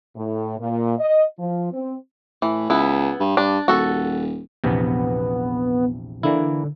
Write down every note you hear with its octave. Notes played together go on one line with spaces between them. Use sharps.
A2
A#2
D#5
F3
C4
A2 E3
C#2 B3 E4
G2
G2 D4
D#1 F#4 A4
A#1 E2 C3 B3
D3 E3 A#3 E4